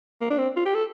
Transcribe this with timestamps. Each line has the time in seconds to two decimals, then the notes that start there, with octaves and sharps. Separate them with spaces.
0.21 A#3
0.30 D4
0.38 C4
0.56 F4
0.65 G4
0.74 A4